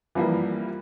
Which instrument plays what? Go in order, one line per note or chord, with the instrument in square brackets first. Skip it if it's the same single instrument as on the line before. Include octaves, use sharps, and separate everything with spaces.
[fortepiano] E3 F3 G3 A#3